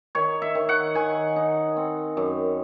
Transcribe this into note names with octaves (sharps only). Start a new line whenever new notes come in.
D#3 C#5
E5
D#3
F#5
D#3 G#5
D#4
C4
F#2